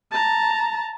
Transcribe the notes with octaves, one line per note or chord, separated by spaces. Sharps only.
A5 A#5